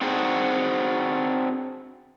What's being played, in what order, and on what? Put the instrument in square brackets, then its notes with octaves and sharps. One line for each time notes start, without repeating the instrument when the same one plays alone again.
[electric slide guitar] C4 D4 D#4 F#4 G#4 C5